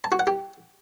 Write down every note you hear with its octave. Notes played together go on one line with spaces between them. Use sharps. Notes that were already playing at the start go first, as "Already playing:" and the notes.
A5
F#4
F#5
G4